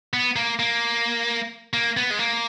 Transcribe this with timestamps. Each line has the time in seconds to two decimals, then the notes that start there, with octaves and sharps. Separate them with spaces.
0.13 B3
0.36 A#3
0.59 A#3
1.73 A#3
1.97 B3
2.11 G#3
2.20 A#3